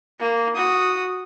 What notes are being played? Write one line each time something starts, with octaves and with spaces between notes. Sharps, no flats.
A#3
F#4 D#6